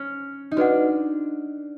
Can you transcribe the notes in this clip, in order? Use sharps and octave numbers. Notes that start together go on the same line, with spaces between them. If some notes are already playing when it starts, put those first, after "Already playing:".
Already playing: C#4
D#4
D4 F#4 B4 D#5 F#5